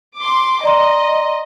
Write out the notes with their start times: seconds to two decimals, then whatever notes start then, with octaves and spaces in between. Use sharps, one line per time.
0.18 C6 D6
0.64 D5 D#5 A#5 C6